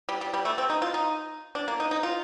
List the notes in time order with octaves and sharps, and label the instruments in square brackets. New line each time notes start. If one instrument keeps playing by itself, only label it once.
[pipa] G3
G3
G3
A3
C4
D#4
F4
D#4
D4
A#3
D#4
D#4
F4